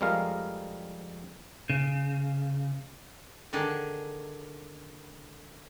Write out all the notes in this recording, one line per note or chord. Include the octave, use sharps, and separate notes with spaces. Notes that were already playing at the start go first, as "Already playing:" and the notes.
F2 G3 G#3 A#4 F5
C#3
D3 D#3 D4 G#4